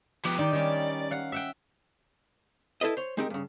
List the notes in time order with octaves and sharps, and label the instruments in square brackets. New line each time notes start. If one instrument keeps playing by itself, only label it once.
[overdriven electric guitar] F3 B3 [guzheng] G4
[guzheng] D#3 D#4 [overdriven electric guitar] D5
[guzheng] D#3 G3 C#4
F5 F#5
E5 F#5 G5
[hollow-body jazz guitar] E4 A4 B4 D#5
C5 C#5
G#3 C4 D#4 G4 A#4
G2 C#3